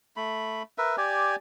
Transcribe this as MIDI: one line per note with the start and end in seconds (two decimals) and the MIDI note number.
0.17 0.63 57
0.17 0.63 83
0.78 0.96 70
0.78 0.96 71
0.78 0.96 76
0.98 1.36 67
0.98 1.36 74
0.98 1.36 80